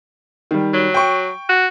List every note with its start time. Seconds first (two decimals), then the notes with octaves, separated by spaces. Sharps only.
0.51 D#3 G3
0.74 F#3
0.94 G5 C#6
1.49 F#4